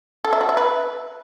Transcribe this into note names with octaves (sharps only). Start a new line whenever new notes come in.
A4
E5
F#4
E5
B4